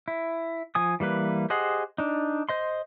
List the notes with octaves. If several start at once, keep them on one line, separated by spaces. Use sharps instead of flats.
E4
F3 G#5 D#6
E3 G3 A#3 B4
G4 G#4 C5 D#5 F#5
D4 D#4
C5 D#5 C6